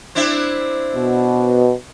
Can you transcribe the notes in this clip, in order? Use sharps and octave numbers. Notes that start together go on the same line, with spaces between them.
C4 D4 E4
B2